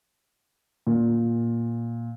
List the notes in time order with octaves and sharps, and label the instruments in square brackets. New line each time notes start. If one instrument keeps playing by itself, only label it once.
[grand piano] A#2